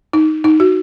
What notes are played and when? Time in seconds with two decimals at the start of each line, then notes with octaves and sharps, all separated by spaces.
0.13 D#4
0.44 D#4
0.60 F#4